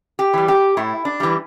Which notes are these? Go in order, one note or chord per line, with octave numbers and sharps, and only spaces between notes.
G4
E3 G3
G4
A2 E4
D4
E3 G3